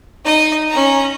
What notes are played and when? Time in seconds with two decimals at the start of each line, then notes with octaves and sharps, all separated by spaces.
0.25 D#4 D#5
0.70 C#4 A#5